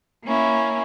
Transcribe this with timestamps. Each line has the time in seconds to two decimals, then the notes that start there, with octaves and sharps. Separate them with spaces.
0.24 A#3 C#4 E4